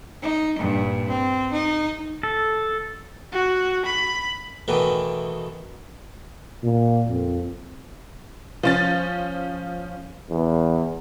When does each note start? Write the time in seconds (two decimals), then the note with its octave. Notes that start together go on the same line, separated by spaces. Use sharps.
0.22 D#4
0.58 G2 A#2
1.09 C4
1.52 D#4
2.23 A4
3.32 F#4
3.86 B5
4.68 B2 D#3 E3 A3
6.64 A#2
7.09 F2
8.63 F3 C#4 A6
10.30 E2